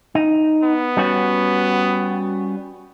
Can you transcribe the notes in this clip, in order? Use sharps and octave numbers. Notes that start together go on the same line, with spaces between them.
D#4
B3
G3 C#4 F#4